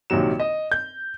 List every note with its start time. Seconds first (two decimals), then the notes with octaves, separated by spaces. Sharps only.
0.10 A#1 C3 D#3 F#3 E7
0.40 D#5
0.72 G6